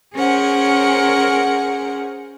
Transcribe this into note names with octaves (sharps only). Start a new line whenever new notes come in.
C#4 G#4 A#4 C5 F#5